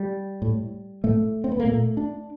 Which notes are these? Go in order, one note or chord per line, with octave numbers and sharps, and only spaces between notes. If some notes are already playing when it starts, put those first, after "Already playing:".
Already playing: G3
A2
A2 A3
C4
B3
A#3
A#2 A3
D4